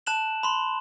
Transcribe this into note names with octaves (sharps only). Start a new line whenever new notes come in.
A5 F#6 E7 F#7
B5 C6